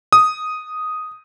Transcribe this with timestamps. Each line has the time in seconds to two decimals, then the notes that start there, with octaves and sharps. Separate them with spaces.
0.13 D#6